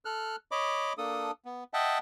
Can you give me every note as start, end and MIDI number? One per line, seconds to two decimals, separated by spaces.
0.05 0.36 69
0.05 0.36 89
0.05 0.36 90
0.51 0.93 73
0.51 0.93 75
0.51 0.93 83
0.51 0.93 86
0.98 1.31 58
0.98 1.31 62
0.98 1.31 69
0.98 1.31 87
1.45 1.64 59
1.74 1.99 75
1.74 1.99 76
1.74 1.99 78
1.74 1.99 79
1.74 1.99 81